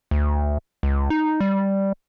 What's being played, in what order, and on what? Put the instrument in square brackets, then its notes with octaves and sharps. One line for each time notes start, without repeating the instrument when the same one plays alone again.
[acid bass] D2
C#2
D#4
G3